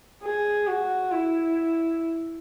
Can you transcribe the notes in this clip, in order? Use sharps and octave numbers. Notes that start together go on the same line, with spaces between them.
G#4
F#4
E4